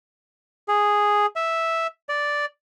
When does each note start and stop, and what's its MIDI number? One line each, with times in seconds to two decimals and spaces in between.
0.68 1.26 68
1.36 1.87 76
2.09 2.46 74